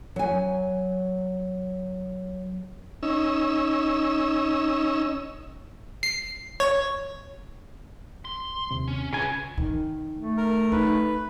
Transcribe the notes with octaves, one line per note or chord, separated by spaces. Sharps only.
F#3 G#5
C#4 D#4 E6
C7
C#5
C6
D#2 C3
C#4
C#3 F4 B4 G#5
D#3
A3
A#4
D#4 B4